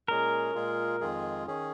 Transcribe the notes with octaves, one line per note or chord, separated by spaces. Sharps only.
A#2 G#3 C#4 G#4 A#4
A#2 G#3 F4 G#4
F2 D#3 G#3 F4 G#4
D#3 C#4 G#4